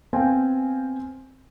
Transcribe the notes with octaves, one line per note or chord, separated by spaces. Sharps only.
B3 C4 C5 F5 G5 G#5